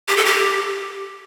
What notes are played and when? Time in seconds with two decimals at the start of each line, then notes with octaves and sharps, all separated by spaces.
0.08 G4
0.17 A4
0.25 G4